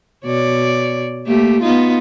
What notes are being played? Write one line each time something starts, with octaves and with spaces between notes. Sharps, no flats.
B2 C#5 D5
A3 A#3 G4
B3 D#4 F4